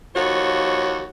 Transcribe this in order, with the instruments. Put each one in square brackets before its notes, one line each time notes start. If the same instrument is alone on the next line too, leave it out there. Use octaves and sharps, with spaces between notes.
[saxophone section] D#2 F3 F#4 C#5